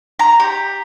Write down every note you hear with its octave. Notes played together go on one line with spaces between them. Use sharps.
A#5
G4